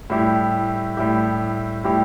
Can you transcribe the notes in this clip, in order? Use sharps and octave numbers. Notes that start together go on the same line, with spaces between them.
A2 G3 E4 G4
A2 G3 E4 G4
A2 G3 E4 G4